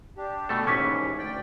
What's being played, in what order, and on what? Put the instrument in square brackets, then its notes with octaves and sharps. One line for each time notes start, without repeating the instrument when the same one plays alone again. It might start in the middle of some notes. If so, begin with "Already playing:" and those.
[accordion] D4 G4
[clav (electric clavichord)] B2 A3 A4
[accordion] D#2 G#2 E3 [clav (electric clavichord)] C#4 [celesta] C#6 D6 B6
[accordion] D2 D5 G5